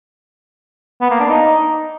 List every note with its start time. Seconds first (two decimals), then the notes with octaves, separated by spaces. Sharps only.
1.01 B3
1.10 A#3
1.20 D4
1.29 D#4